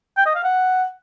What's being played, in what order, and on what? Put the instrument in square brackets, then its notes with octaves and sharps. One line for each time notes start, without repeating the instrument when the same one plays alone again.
[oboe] G5
D#5
F5
F#5